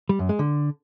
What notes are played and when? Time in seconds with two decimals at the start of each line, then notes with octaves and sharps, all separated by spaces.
0.09 G3
0.19 F#2
0.29 G#3
0.39 D3